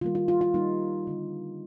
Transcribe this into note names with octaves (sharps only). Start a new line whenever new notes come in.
D#3 G3 A#3 F4
F4
F4
F4
D#3 G3 A#3 D#4
D3 G3 C4